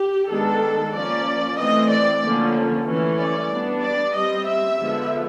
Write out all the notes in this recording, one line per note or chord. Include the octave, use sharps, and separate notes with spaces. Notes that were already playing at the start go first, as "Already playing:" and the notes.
Already playing: G4
D#3 G#3 B3 D4 A4
F3 A#3 C#4 D5
E3 A3 C4 D#5
D5
D3 F3 A#3 C#4
E3 A3 C#4
D5
G3 B3 D4
D5
G3 C4 D#5
E5
D3 F3 G#3 B3